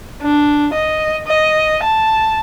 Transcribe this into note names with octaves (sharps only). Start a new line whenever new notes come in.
D4
D#5
D#5
A5